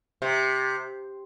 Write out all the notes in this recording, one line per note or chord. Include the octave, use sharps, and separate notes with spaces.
C3